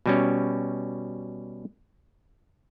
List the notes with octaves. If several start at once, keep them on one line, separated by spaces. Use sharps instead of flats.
B2 G3 C#4